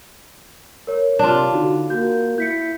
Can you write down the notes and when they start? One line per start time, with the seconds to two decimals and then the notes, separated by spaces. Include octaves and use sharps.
0.87 A#4 C#5
1.19 C3 D4 F4
1.52 D3 D#4 F#4
1.90 A#3 F#4 G6
2.38 E4 G6 B6 C#7